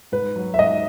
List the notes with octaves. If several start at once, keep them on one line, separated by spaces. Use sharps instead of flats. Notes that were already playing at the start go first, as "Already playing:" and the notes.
G#2 B4
F#3
E5
G#2 D#5